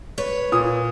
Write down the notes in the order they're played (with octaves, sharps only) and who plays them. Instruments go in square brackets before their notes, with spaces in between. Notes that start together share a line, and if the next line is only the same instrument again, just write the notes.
[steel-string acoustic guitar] B4 C#5
[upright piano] A#2 D#6